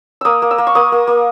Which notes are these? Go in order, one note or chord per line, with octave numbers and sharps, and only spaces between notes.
A#3 D#6 E6
A#3
E6
A#3
C#6
A#3 D#6
A#3
A#3